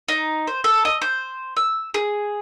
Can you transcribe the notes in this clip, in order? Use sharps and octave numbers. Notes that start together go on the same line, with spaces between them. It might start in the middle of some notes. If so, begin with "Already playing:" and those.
D#4
C5
A4
D#5
C5
E6
G#4